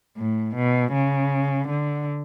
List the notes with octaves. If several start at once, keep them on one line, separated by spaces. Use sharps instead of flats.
A2
B2
C#3
D3